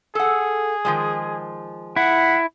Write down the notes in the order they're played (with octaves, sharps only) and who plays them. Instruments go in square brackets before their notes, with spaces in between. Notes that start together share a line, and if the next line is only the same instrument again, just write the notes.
[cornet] G#4 [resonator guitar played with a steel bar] A4 F#5
[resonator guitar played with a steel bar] D#3 F3 G#3
[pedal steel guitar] E4 [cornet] F#5